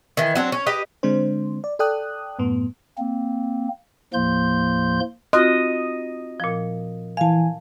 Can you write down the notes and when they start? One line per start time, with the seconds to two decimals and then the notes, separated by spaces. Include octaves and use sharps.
0.17 D#3 E3
0.35 F#3 C4 D4
0.52 C#4
0.66 G4 B4 D#5
1.03 D3 G#3 C4 D4 C5
1.64 D5
1.79 A4 D5 G5 D#6 F#6
2.39 F#2 A2 B3
2.98 A#3 C4
4.14 D#2 A2 F3 A#3 C6 G6
5.33 C4 F4 F#4 D#5
6.40 A#2 F3
7.17 E3 F5 G#5 A5